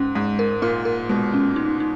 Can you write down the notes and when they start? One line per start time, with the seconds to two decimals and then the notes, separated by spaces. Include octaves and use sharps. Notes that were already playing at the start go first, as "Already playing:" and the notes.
Already playing: G#2 C#4
0.15 G#2 G#3
0.39 A#4
0.62 A#2 A#4
0.85 A#4
1.09 B2 G#3
1.34 C#4
1.56 D#4
1.80 D#4